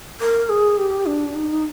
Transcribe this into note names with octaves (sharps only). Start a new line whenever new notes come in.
A#4
G#4
G4
D4
D#4